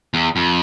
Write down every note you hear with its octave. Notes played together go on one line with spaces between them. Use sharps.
E2
F2